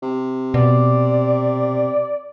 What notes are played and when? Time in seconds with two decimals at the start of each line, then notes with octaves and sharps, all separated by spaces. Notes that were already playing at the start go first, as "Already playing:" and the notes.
0.02 C3
0.54 B2 D5